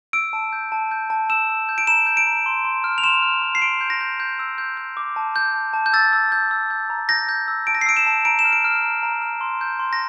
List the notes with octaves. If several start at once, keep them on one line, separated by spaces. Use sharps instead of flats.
E6 D7
A5
G6
A5
G6
A5
E6 E7
E6
G6
D7
A#5 E7
G6
D7
A#5
C6
C6
F6
F7
C6 E7
F6
C6
C7
C6 D7
G6
A#6
G6
G6
E6
G6
G6
D6
A5
G6
A5
A5
G6
E6 A6
E6
G6
E6
G6
A#5
G6 A#6
G6
E6
A5 D7
A#6
C7
E6 D7
E7
A5
A#5 D7
E7
F6
D7
F6
A#5
A#5
F6
C6
G6
C6
A#6